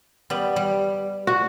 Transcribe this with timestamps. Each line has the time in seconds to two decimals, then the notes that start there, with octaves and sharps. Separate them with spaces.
0.30 G3 B3 B4
0.56 G3
1.27 F#4